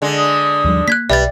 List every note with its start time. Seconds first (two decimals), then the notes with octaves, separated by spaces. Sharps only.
0.02 D3 G#3
0.18 D#6
0.64 D#2 F3 G3
0.88 A#3 F#6 G#6 B6
1.10 B1 G3 B4 E5 A6